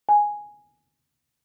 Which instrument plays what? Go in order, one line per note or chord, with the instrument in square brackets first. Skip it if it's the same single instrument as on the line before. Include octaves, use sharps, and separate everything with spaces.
[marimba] G#5